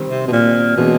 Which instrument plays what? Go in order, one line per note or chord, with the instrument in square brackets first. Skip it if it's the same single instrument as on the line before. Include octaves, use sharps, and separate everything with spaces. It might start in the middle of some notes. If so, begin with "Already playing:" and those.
Already playing: [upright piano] D#3 G3 C4
[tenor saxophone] C3
B2
A#2
[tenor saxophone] B2 [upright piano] E3 G#3 C#4